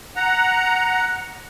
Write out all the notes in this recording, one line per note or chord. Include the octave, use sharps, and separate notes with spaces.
F#5 A#5